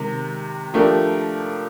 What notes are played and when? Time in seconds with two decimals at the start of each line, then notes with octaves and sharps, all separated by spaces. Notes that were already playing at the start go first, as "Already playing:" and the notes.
Already playing: C3 D#3 G#3
0.74 F3 A3 D4 G4 A#4